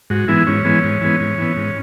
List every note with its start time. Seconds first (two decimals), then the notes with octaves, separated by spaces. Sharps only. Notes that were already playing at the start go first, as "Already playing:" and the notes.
0.10 G#2 F#4
0.28 E3 G#3 B3 E4
0.47 G#2 C#4
0.65 E3 G#3 B3
0.84 G#2
1.01 E3 G#3 B3
1.20 G#2
1.38 E3 B3
1.56 G#2